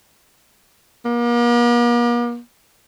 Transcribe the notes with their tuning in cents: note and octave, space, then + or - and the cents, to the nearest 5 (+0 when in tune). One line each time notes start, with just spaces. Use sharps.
A#3 +45